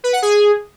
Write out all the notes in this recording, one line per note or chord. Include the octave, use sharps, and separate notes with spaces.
B4
F#5
G#4